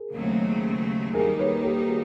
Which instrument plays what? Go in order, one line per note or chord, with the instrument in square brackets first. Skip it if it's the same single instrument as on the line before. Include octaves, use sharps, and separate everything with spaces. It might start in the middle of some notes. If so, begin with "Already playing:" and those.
Already playing: [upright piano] G#4 A#4
[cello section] D#2 C#3 F#3 A3 C4
[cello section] D#3 G3 A#3 D#4 [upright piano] G#4 A#4
[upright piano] B4 C#5
G4 A4
F#4 G#4